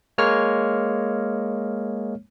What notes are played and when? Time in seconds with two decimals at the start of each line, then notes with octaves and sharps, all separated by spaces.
0.18 G#3 A#3 C#5 F6